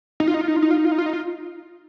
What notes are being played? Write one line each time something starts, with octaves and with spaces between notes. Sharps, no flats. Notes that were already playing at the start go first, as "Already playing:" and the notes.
D#4
F4
D#4
F4
D#4
F4
D#4
F4
D#4
F4
D#4
F4
D#4
F4